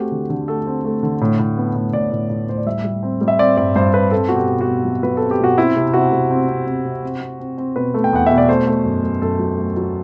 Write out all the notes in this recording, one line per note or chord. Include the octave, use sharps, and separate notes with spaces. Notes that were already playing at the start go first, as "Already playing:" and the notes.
Already playing: A3 C4 F#4 G4
D3
D3
A3 A4
C4
A3
D3
A2
A2
B3
A2
A2 D5
A2
A2
A2 C5
D5
G3 E5
G3
C4
G3
E5
C4 D5
G2 D5
G2 C5
C4 B4
C4 A4
B2 F#4
G4
B2
F#4
B2
F#3
F#3 B4
C4 A4
G4
B2 F#4
C4 E4
C3
C3 F#4
C3
C4
C4
C4
C3
C4
C4
C4
C4
B2 B4
A3
G5
E2 F#5
B2 E5
D5
A3 C5
A3
F#2
F#2
F#2 A4
F#3
A3
F#3